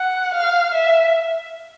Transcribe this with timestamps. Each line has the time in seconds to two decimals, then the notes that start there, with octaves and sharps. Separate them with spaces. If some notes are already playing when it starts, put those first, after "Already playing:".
Already playing: F#5
0.34 F5
0.74 E5